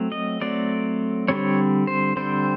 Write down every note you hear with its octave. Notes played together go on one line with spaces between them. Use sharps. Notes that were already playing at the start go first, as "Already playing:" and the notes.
Already playing: F#3 A3 C4
D#5
F#3 A3 C4 D5
D3 G3 C4 C#5
C5
D3 G3 C4 C5